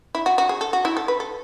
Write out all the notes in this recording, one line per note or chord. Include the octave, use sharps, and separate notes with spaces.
E4
F#4
F#4
G#4
A4
F#4
E4
A4
B4
A4